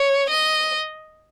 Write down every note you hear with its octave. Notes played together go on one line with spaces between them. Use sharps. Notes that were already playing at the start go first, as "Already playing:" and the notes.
Already playing: C#5
D#5